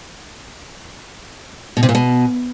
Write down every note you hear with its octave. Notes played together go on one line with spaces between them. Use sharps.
B2
C3
A#2
B2